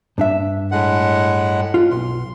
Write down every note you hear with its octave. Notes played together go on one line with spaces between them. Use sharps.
G2 D4 E5
A2 G#3 F#5
F4
B1 C6